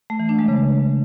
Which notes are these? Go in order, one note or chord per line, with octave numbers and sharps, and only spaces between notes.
A3
E3
D4
G#3
C#3